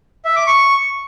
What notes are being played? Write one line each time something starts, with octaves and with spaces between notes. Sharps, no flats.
E5
D6
C#6